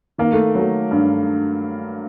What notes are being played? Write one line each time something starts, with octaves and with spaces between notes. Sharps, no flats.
D#3 A#3
A3
F#3 A3
G2